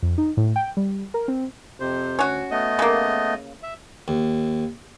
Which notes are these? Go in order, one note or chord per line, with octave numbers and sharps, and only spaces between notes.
F2
D#4
A2
G5
G3
A#4
C4
F2 C3 C5
D2 C#4 F#4
A3 B3 D#5
C#3 A#3
E5
D#2